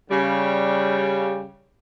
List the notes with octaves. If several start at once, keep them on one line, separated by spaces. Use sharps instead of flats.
C#3 G3